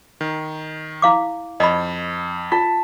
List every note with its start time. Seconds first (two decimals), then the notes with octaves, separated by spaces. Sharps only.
0.21 D#3
1.02 E4 F5 D6
1.60 F2 D#5 B5
2.52 F4 A5 B6